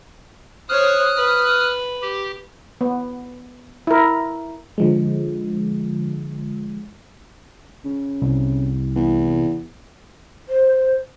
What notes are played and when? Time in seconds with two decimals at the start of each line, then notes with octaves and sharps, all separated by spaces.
0.69 C5 C#5 D#6 F6 F#6
1.17 B4
2.02 G4
2.81 B3
3.87 E4 A#4
4.78 D3 F3 G#3
7.84 C#3
8.22 C2
8.96 E2
10.49 C5